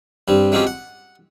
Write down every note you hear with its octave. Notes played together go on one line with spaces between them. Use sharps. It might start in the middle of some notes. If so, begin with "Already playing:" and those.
G2 G3 C4
F#3 G#3 C4 C#4 F4 G4
F#5